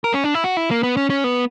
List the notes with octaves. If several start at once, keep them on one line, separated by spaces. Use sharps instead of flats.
A#4
C#4
D4
E4
F#4
E4
A#3
B3
C#4
C#4
B3